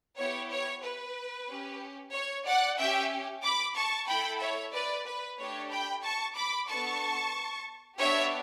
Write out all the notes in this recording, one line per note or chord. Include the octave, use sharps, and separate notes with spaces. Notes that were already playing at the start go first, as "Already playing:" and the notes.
B3 E4 G4 C#5
C#5
B4
C#4 G4
C#5
D5 F#5
C#4 G4 E5 G5
B5 D6
A5 C#6
A3 E4 A4 G5 B5
C#5 E5
B4 D5
B4
A3 D4 G4 C#5
G5 B5
A5 C#6
B5 D6
B3 D4 A4 A5 C#6
B3 D4 G4 C#5 E5